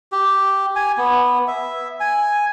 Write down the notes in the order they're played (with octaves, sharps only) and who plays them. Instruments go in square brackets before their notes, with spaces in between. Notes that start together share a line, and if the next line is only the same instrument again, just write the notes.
[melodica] G4
G#5
B3
E5
G#5